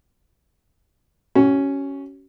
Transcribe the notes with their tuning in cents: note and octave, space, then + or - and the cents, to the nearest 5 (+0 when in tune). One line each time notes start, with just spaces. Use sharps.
C#4 +0 F#4 +45